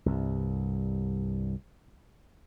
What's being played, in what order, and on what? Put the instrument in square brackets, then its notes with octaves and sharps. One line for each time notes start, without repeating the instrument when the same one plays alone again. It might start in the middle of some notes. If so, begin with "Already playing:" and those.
[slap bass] C2 G2